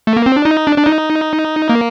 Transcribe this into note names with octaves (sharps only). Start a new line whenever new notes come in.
A3
A#3
C4
D4
D#4
D4
D4
D#4
A#3